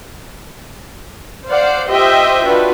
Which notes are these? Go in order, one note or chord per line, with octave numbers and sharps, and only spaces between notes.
C5 D5 F5 F#5
F4 G4 C5 D#5 E5 G5
D4 F4 F#4 B4